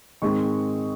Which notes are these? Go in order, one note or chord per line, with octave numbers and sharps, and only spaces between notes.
G#2 D#3 G#3 C4 C#6